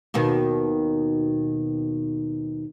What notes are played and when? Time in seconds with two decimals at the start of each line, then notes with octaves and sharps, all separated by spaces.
0.14 D#2 B2 D#3